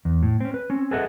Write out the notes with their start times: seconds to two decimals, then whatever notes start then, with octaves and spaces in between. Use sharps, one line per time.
0.05 E2
0.23 A2
0.41 C4 C#4
0.54 B4
0.70 C4 C#4
0.91 G#4 A4 B4 D#5 E5 F#5